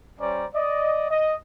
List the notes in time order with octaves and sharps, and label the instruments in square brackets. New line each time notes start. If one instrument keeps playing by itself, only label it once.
[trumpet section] G3 C#4 C5 D5 A#5
D5 D#5
D#5